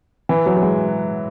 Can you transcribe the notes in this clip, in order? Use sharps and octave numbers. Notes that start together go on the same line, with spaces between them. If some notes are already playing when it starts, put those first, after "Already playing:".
E3
F#3
F#3
G#3